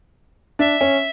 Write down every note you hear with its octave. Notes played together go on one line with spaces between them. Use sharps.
D4 E5
C#4